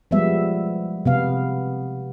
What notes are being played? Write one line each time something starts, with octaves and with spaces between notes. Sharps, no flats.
F3 G3 G#3 B3 E5
C3 B3 F5